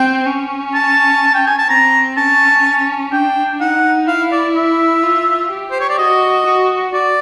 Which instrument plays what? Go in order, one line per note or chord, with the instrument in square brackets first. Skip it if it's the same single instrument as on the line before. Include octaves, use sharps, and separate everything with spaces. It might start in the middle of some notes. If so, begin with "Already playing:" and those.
Already playing: [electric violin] C4 [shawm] G5
[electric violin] C#4
[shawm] A5
G5
G#5
A5
[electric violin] C4 [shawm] A#5
[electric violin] C#4 [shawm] A5
[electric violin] D4 [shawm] G5
[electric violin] D#4 [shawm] F#5
[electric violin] E4 [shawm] F5
[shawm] D5
E5
[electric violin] F4
G4
[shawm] C5
C#5
D5
[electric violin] F#4 [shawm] D#5
[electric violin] F#4
[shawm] D5